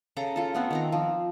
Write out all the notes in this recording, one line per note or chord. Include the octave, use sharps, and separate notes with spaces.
C#3 A4 A#5
F4 A4
A3 B3 C4
D#3 C4 A#5
F3